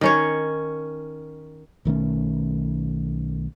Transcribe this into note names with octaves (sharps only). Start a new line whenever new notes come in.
D#3 C#4 C#5
B1 D#3 A3 C#4